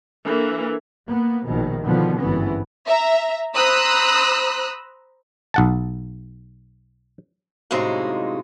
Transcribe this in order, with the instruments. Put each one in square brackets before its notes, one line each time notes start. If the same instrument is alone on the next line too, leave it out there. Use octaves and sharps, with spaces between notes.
[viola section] E3 A#3 [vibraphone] D4 A4 A#4
[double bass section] A#3 B3
A#1 B2 D#3
B2 D3 D#3 F3 B3
G#1 G2 E3 B3 C#4
[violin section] E5 A#5
C5 A#5 B5 D#6 E6 F#6
[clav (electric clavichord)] B1 F#5 A5
[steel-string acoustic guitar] F#2 A2 C3 G#3 A#3 D#4